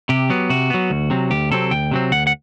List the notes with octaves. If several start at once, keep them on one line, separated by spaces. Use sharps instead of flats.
C3 G4
F#3 B3
C3 F#4
F#3 B3
D2
C3 F#3 C4
D2 G4
C3 F#3 C4 A4
D2 G5
C3 F#3 C4
D2 F#5
F#5